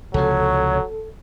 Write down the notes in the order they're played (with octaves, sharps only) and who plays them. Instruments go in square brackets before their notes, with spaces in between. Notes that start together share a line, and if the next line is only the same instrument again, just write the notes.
[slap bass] C#2 C3 F3 [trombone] F#3 [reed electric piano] A4 [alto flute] C#5